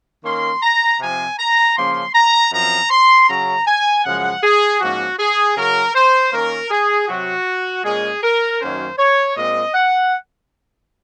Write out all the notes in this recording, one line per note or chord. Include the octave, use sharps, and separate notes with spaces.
D#3 A#3 C#4 C6
A#5
C3 F3 C4 G#5
A#5
C#3 F3 A#3 C#4 C6
A#5
F#2 F3 C4 A#5
C6
C#3 F#3 C#4 A#5
G#5
F#2 C#3 F3 G#3 F#5
G#4
G#2 F3 A#3 C#4 F#4
G#4
C#3 F#3 C#4 A#4
C5
D#3 A#3 C#4 A#4
G#4
C3 F#3 C4 F#4
A#2 G#3 C#4 G#4
A#4
F#2 D#3 F#3 A#3 C#4 C5
C#5
A#2 G#3 C4 D#5
F#5